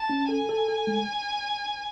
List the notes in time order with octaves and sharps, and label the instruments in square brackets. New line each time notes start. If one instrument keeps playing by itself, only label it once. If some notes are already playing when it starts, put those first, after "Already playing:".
Already playing: [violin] A5
[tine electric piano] C#4
[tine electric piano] A4 [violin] G#5
[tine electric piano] A4
A4
G#3